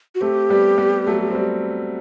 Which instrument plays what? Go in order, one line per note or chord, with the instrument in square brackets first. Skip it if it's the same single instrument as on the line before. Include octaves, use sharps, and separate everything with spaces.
[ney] F#4
[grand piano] A3 C4 [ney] G4
[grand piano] G3 B3
G3 B3
F#3 A3
C4
G3